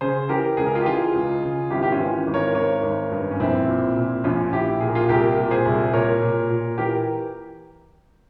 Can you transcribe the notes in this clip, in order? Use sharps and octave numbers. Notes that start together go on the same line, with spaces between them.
C#3 G#4 C5
E3 G4 A#4
C#2 G#4
A#4
F4 G#4
G4
E3 F4 G#4
C#2
C#3
G#1 E4 G4
G4
C#4 F4
E3
G#1
A#4 C#5
G#1 A#4 C#5
G#1
G2
C#4
A#1 C4 E4
A#2
A#2
A#1 C#4 F4
A#1 E4 G4
A#2 G#4
A#4
F4 G#4
C2 G4 A#4
A#2
G#4 C5
C2
A#2 A#4 C#5
A#2
A#2
E3 G4 A#4